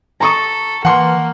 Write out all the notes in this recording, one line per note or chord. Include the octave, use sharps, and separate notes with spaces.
A4 A#5 C#6 D#6
E3 A#3 F#5 C6